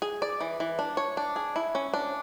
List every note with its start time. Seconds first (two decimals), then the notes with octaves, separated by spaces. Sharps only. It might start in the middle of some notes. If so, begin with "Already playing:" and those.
0.02 G#4
0.22 D5
0.41 E3
0.60 E3
0.79 D4
0.97 C#5
1.17 D4
1.36 G#4
1.56 E4
1.75 C#4
1.94 D4